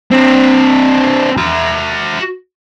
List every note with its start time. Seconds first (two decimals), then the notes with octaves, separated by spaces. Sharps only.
0.11 C4 D4
1.37 F#4 E5